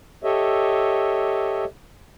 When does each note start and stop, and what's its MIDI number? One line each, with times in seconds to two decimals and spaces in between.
0.24 1.65 67
0.24 1.65 69
0.24 1.65 73
0.24 1.65 75
0.24 1.65 76